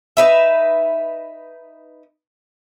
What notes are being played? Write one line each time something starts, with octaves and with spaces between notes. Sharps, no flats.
D#4 B4 E5